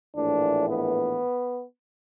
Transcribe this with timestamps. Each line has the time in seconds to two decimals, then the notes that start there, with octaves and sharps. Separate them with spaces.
0.15 A#1 A2 E3 D4
0.67 B3